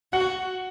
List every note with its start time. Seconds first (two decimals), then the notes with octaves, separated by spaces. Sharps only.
0.13 F#4 F#5